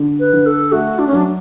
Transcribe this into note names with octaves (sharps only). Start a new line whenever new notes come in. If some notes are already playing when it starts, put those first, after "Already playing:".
Already playing: D3
B4
D3
A4
A3 F#4
D4
C#4
F#3 D4